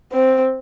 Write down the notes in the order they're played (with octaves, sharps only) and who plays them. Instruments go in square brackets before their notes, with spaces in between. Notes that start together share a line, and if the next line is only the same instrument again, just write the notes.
[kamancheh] C4